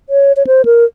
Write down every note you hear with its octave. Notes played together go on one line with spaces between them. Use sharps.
C#5
C#5
C5
A#4